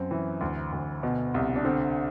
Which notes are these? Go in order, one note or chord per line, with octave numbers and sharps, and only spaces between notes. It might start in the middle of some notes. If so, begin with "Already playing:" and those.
Already playing: F#2 C4
E3
D2
D2
B2
C2
D4
D3 C4